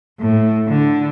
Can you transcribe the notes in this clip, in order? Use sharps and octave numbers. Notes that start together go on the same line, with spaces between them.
A2
D3